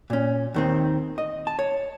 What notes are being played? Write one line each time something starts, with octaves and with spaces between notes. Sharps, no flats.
A#2 C#4
D#2 D#3 C4
D#5
A5
C#5